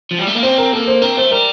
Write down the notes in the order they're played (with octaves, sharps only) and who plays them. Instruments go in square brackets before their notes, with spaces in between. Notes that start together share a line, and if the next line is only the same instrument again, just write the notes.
[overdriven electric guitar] F3
G3
A3
A#3
[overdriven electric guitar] C4 [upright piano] C5
[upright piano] A#4
[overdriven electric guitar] A#3 [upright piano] A4
[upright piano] C5
[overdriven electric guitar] C4 [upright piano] A#4
[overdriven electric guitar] A3 [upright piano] C5
[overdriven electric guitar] G3 [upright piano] A#4